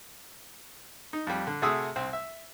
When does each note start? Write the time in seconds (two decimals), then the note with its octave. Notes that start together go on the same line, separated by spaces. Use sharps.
1.13 D#4
1.27 F2 G3
1.47 D3
1.62 C3 A3 F#4 G#4 D#6 E6
1.96 C2 C4
2.13 E5